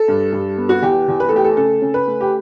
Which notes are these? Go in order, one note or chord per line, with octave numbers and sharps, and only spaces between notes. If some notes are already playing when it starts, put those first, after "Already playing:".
Already playing: A4
G2
G2
B3
F#4
E2 G4
E2
B4
A4
A3 G4
A4
C#3 A4
C#3
B4
A3
G4